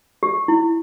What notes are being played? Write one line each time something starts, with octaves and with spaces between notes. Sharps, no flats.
G4
E4